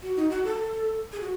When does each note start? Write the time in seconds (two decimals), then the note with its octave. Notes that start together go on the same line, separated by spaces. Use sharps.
0.03 F#4
0.17 D#4
0.30 F#4
0.44 A4
1.13 G#4
1.21 F#4